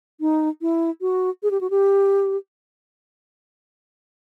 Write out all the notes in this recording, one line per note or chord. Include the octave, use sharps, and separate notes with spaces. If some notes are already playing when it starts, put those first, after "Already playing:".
D#4
E4
F#4
G#4
G4
F#4
G4